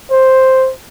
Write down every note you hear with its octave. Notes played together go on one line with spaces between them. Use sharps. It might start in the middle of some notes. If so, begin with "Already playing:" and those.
C5